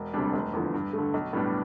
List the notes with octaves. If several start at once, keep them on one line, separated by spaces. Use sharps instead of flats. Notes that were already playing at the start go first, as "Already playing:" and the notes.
Already playing: E1
D2 C3 G3 D4
F1
E2 D3 F3
G2
A3
D3
B1
A2 G3 B3 D4